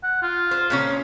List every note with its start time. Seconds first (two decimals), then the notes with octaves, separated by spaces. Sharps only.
0.03 F#5
0.22 F4
0.51 C5
0.70 A#2 C#3 C#4